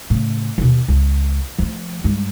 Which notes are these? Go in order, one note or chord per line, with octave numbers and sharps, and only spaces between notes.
A2 C#3
D#2 B2
C#2
F3 A3
G2 G#3